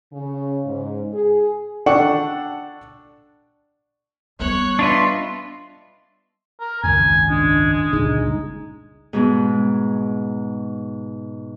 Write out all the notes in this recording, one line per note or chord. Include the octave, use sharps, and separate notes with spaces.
C#3
G#2
G#4
D4 A4 D5 F#5 G5 C#6
G3 B3 C#5 F#6
D4 F4 B4 D#5 E5 C6
A#4
G#1 C#2 F#2 G#5
G#3 D4
G#3
G1 C#2 A#2 D#4 G#4
G#2 B2 G#3